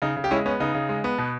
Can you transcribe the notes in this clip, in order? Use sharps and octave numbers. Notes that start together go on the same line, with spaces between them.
C#3 D#4
C#3
G4
G#3 C#4 E4
B3 C#4
C#3 D#4
C#3
G#3
B3
B2